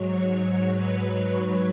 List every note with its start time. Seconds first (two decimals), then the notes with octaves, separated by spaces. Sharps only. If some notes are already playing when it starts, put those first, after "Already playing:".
Already playing: G#2 F#3 C#5
0.72 B4
1.15 C#5